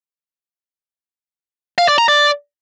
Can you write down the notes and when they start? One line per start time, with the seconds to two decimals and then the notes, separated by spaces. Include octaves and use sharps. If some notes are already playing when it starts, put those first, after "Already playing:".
1.78 F5
1.88 D5
1.98 A#5
2.08 D5